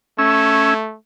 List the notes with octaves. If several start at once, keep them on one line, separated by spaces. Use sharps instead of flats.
A3 C#4 E6